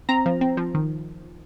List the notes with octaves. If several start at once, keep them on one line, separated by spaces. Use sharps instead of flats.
C4 A#5
F3
C4
F3
D#3